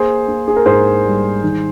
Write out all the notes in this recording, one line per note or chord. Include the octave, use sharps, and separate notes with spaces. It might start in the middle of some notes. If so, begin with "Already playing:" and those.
Already playing: A#3 G#4 C5
A#3
G#4
A#4
G#2 G#4 C5
G3
D#3